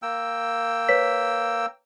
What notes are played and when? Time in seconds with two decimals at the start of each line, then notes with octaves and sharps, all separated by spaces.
0.02 A#3 G5 E6
0.89 B4 C#5 B6